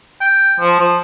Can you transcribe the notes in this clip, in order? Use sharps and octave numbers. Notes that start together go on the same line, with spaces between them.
G5
F3
F3